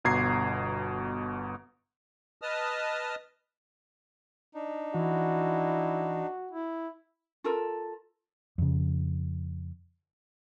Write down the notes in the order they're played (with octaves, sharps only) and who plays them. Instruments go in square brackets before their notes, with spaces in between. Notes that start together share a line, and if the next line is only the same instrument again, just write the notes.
[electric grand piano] G1 B2 A#5 G#6 C7
[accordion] B4 D#5 A5 D#6 F6
[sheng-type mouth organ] D4 D#4
[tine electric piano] E3 [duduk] E4 [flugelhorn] F#4
[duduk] E4
[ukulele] F4 A4 A#4
[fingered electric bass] F2 C#3